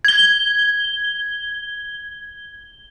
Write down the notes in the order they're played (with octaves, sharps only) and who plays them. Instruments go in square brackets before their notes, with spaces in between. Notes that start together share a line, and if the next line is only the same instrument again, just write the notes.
[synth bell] G#6 G7